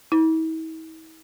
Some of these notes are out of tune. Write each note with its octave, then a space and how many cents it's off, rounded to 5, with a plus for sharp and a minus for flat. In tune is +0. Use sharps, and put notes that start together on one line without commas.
E4 -45